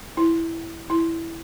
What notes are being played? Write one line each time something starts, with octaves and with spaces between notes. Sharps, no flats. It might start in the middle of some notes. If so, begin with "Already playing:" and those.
E4
E4